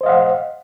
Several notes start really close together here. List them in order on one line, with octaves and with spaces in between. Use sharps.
C5 D#5 F5 F#5